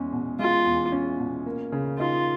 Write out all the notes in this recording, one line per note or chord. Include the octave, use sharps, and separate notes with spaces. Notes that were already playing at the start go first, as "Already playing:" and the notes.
Already playing: E2 G#3 C#4
B2
G#3 F4
E2
C#4
B2
A#3
C#3
D#4 F4